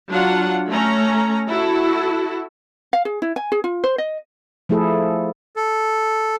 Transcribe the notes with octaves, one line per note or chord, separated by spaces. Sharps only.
F#3 D4 F4 F#5
A3 C#4 A#5
E4 F#4 A4
F5
G#4
E4
G#5
G#4
F4
C5
D#5
F3 A3 E4 G#4 A4
A4